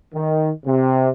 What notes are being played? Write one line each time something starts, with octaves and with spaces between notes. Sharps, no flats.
D#3
C3